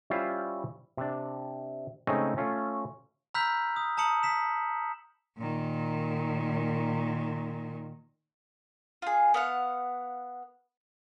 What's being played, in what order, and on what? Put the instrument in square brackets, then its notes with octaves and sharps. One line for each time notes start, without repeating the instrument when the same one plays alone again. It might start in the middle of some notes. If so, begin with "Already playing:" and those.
[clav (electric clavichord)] G3 C#4 E4 F4 C5
C3 D4
C#3 G#3 A3 C4 C#4 D#4
A3 C#4 F4
[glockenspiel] A#5 B5 E6 F6 G6 B6
D#6
A5 A#5 D#6 C#7 F#7
B6 E7
[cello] A#2 D#3
[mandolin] F4 G#4
B3 F5 F#5